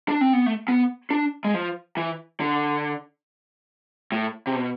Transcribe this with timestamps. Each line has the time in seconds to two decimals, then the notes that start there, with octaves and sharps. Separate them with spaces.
0.08 D4
0.21 C4
0.33 B3
0.46 A3
0.68 B3
1.11 D4
1.45 G#3
1.54 F3
1.97 E3
2.40 D3
4.12 A2
4.47 C3
4.55 B2